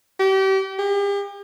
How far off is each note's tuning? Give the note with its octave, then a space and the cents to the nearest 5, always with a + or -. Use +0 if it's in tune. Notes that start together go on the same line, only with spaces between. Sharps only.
G4 -30
G4 +40